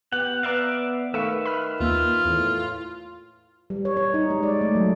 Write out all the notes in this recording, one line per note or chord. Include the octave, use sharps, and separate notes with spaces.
B3 G4 F#5
B3 D5 E5 F5 A#5 F#6 A6
D#3 A3 B4 E5 F5 C#6
B5 F6
D#2 A#3 F4 E6
E2 A2
G3
C#5
C#5
D#4
G#3
D5
A3
F#3